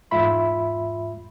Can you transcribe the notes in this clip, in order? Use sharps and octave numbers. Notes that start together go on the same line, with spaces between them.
E2 G#2 F4 E5 B5 C6